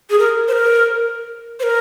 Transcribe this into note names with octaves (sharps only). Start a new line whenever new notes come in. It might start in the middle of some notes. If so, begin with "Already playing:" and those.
G#4
A#4
C5
A#4
C5
A#4